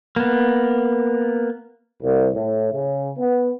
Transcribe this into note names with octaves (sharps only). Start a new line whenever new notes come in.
A#3 B3
C2
A2
C#3
B3